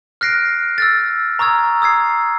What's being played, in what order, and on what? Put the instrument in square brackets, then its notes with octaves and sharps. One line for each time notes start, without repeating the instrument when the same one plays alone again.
[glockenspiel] F6 F#6 A#6 C7 D7
E6 F6 A6
A#5 C#6 D#6 E6 G#6
D#6 E6 G#6 C7